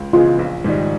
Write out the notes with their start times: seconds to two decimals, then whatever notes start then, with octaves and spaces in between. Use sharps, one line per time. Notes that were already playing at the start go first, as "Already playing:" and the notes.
Already playing: C#2
0.13 C#3 E3 G#3 B3 F4
0.39 A#1
0.64 G#2 D#3 G3